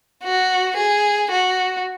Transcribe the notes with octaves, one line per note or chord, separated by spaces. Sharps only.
F#4
G#4
F#4